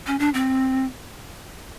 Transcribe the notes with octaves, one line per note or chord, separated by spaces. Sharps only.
C#4
D4
C4